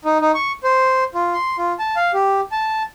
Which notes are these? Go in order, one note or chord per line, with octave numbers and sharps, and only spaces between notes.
D#4
D#4
C#6
C5
F4
C6
F4
A5
F5
G4
A5